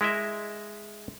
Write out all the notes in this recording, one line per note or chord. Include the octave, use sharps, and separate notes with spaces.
G#3 E4 A#4 D#5 E5